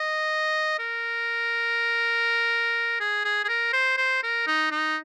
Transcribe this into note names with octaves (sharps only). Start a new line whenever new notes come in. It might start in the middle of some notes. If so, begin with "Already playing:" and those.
Already playing: D#5
A#4
G#4
G#4
G#4
A#4
C5
C5
A#4
D#4
D#4